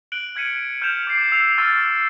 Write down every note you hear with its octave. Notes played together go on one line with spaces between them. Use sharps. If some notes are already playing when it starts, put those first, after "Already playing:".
F#6 D7 F#7 G7
F6 G#6 B6 C#7 D#7
F6 G6 G#6 C#7 E7 F7
D6 A6 C7 D7
E6 C7 F7
C#6 E6 F6 A6 D#7